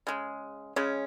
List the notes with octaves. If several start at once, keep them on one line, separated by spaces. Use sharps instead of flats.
C#3 G#3
C#3 G#3 C#4